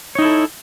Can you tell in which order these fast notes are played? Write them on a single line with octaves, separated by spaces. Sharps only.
C#5 D#4 E4 A4